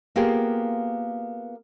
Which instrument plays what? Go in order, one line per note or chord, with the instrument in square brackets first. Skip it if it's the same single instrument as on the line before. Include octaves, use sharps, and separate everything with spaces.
[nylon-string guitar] A#3 B3 F4 G4 G#4 C5